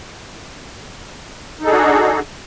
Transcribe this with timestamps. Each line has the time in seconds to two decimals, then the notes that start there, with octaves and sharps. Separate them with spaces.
1.61 D#4
1.64 A4
1.67 G#4
1.70 D4
1.72 F#4